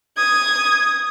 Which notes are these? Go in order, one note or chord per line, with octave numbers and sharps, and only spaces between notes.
D#6 G#6